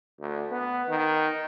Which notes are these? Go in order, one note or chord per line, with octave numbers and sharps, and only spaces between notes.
D2
B3
D#3